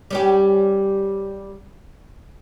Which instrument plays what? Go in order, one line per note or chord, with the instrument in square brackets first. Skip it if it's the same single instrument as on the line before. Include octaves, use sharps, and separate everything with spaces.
[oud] G3 C#4 G4